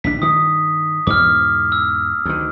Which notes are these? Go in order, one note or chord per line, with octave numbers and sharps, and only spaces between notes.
A#1 D#2 D4 B6
G2 D#3 D#6
E2 G#2 B2 D6 F6
E6
D2 D#3